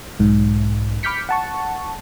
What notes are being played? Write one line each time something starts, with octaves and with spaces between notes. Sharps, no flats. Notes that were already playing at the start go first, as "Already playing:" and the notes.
B1 G#2
B5 D6 F6 G6 B6 C#7
F#5 A5 C#6